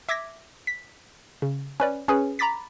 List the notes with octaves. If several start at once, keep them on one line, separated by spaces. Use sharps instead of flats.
E5 D6 G#6 A#6 B6
B6
C#3
C#4 B4 D5
C#4 G#4 B4
A#5 B5 D6 A6 B6